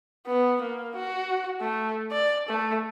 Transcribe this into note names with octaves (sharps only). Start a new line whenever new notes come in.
B3
A#3
F#4
A3
D5
A3